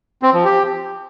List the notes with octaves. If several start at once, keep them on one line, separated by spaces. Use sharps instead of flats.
C4
F3
G4